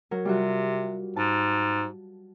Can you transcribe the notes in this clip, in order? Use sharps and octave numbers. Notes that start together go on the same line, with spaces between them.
F#3 A#4
C3 G3 F4 F#4
G#2 A5